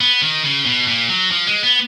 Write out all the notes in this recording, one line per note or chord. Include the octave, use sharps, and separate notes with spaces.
B3
D#3
C#3
B2
A#2
F#3
F3
G#3
B3